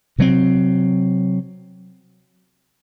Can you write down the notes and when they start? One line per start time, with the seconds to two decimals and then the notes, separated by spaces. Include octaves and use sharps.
0.18 C3 F#3 C4